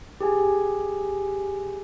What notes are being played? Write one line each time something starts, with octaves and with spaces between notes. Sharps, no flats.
G4 G#4 G#5